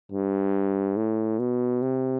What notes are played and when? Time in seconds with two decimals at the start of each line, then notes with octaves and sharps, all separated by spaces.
0.12 G2
0.97 A2
1.39 B2
1.82 C3